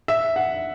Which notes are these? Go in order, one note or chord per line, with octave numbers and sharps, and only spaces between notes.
E5
F#5